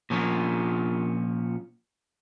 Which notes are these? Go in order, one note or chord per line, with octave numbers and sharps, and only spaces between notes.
A#2 F3 C#4